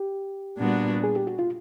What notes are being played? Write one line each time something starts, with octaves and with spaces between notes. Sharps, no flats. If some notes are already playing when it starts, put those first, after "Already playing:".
Already playing: G4
A#2 G3 B3 D4 F#4
G#4
G4
F#4
F4